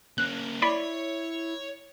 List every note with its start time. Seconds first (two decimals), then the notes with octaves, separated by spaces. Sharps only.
0.18 A#3 C#4 F#6
0.62 E4 C#5 D5 B5